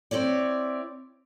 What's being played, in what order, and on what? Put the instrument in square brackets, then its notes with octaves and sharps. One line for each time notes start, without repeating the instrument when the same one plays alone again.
[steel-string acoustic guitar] C4 E4 C#5 D5